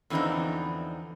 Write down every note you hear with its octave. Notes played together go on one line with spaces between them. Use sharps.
E2 D3 E3 F3 C4 D#4